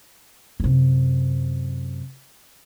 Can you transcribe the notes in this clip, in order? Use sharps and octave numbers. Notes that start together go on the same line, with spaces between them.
F#2 C3